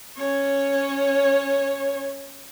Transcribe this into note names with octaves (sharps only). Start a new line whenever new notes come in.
C#4 C#5